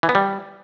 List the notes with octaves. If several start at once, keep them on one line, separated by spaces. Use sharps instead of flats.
E3
B3
G3